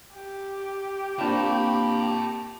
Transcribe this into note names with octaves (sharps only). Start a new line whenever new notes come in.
G4
A#3 C4 D4 F4 A5 B5